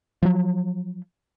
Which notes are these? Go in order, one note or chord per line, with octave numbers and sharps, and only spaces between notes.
F3 F#3